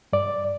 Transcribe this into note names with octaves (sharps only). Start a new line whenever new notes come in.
G2 D5